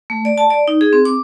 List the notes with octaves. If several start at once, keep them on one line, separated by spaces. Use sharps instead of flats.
A3
D5
A5
D5
D#4
G#4
C4
D6